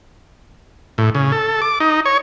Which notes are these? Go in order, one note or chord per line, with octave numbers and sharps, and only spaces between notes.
A2
C#3
A4
D6
D#4
C#5